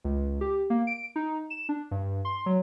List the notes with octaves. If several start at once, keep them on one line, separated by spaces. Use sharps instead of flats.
C#2
G4
A#3
D7
D#4
E7
D4
G2
C6
F#3